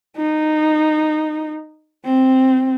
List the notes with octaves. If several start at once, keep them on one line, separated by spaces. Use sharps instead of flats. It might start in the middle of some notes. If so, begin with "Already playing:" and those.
D#4
C4